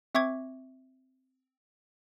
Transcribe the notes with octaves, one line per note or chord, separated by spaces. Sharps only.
C4 E5 C#6 D6 G#6